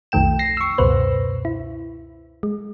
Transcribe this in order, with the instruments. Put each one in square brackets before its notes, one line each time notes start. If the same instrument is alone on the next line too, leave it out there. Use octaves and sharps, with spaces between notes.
[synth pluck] B1 F2 D#3 A3 G5 E7
A#6 C7
C#6 E6
C#2 F#2 B2 B4 C5
E4
G#3